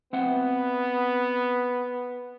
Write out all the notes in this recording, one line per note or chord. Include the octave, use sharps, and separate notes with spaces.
B3 C4 E5 F#5